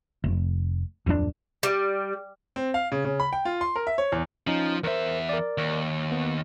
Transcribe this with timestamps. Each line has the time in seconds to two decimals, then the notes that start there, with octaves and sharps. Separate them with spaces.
0.24 F1
1.06 D1 F2 F#3 D4
1.63 G3
2.56 C4
2.74 F5
2.92 C#3
3.05 C#3
3.20 B5
3.33 G5
3.45 F4
3.61 C6
3.76 A#4
3.87 E5
3.98 C#5
4.12 E2
4.47 F3 C#4 D#4
4.84 E2 A#4 C5 E5
5.29 A#4 D5
5.58 D#2
6.12 B3